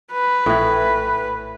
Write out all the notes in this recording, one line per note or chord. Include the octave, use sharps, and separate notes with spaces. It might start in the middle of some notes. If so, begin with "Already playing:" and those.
B4
A#1 A2 E3